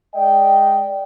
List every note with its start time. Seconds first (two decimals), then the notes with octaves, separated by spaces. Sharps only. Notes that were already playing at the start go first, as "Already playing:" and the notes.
0.15 G#3 D5 D#5 G5